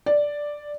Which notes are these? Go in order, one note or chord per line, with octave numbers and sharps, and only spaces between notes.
D5